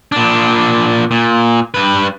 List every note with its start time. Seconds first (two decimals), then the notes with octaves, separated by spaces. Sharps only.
0.12 A#2 D4
1.11 A#2
1.74 G2 B4